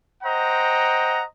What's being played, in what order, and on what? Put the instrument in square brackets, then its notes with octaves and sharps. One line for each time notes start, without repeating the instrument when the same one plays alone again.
[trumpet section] C5 D#5 F#5 G5 A#5